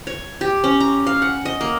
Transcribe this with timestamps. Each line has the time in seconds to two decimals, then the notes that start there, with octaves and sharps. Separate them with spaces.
0.07 C#5
0.41 G4
0.64 C#4
0.80 A#5
1.07 F5
1.22 F#5
1.45 D#5
1.61 A#3